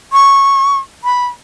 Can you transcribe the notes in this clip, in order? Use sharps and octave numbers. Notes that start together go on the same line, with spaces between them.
C#6
B5